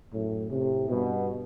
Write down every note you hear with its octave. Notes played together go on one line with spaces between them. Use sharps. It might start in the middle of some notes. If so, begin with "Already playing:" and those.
F#2 A2
A2 C3
G2 B2